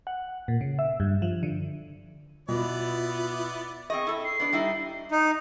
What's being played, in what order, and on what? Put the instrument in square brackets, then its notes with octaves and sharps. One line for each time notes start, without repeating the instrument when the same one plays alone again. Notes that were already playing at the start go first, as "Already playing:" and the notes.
[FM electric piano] F#5
A#2
C#3
E5
G2
F3
D3
[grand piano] B2 [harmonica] B3 D5 [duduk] E4 [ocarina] F4
[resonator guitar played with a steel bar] C4 G#4 D#5 [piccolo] C#6
[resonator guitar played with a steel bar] E4 A4
[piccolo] C7
[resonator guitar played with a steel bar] B3 D4
G3 D#4 E4
[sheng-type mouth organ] D#4